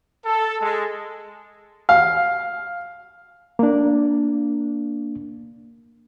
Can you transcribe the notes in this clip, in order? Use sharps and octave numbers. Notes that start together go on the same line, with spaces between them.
A4
G#3
F5
A#3 D4